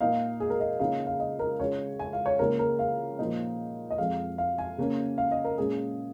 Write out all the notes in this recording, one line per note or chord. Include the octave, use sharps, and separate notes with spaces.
A#2 A#3 D#4 F5
G#4
A#4
D#5
C#2 C#3 A#3 D#4 F5
F5
D#5
A#4
C#2 C#3 G#3 C#5
G#5
F5
C#5
C#2 C#3 A#3 A#4
A#4
F5
A#2 F3 A#3 D#4
D#5
F2 F3 G#3 F5
F5
G#5
C#3 A#3 C#4
F5
D#5
A#4
A#2 G#3 C#4 G#4